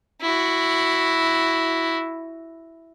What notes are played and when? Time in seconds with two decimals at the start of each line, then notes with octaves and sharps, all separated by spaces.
0.21 E4 F#4